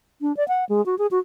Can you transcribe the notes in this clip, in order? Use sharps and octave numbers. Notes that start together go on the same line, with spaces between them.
D4
D5
F#5
G#3
F#4
G#4
F#4